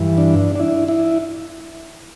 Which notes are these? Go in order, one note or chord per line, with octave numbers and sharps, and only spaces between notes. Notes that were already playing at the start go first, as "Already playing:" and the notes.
Already playing: G2 E3
D4
D4
E4
E4